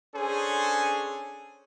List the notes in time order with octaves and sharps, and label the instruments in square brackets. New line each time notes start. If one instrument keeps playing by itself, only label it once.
[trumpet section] C#4 D4 G#4 A4 C5 G#5